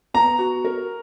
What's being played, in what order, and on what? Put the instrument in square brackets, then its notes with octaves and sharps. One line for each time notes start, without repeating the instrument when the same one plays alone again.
[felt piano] B3 [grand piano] A#5
[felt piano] F#4
A#4